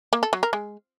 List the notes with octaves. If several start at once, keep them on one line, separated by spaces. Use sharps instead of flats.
A#3
A4
F#3
A#4
G#3